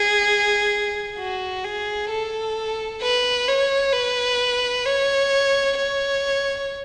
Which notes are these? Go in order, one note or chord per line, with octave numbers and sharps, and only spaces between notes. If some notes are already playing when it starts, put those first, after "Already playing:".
Already playing: G#4
F#4
G#4
A4
B4
C#5
B4
C#5
C#5